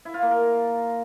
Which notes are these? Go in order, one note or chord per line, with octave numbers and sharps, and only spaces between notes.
E4
F4
A#3
A#4